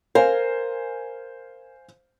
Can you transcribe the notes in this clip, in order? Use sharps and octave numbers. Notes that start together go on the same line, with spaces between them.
A#4 C5 F5 G#5